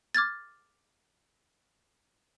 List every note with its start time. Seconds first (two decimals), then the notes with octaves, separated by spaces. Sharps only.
0.15 D6 F6 G#6 A6